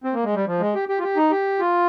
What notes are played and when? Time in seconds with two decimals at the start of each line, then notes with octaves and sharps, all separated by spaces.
0.04 C4
0.14 A#3
0.24 G#3
0.35 G3
0.47 F3
0.60 G#3
0.75 G4
0.89 G4
0.99 F4
1.03 G4
1.17 D#4
1.31 G4
1.60 F4